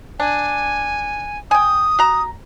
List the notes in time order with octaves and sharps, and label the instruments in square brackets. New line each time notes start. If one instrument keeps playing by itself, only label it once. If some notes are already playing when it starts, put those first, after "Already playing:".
[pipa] D4 [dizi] G#5
[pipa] G5 G#5 [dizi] D#6
[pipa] F#4 A#5